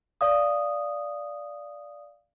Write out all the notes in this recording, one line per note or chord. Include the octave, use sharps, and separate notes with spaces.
D5 F5 D#6